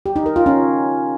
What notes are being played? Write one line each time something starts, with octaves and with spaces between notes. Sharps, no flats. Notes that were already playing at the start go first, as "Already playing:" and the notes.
G4
D#4
A#4
F4
C#4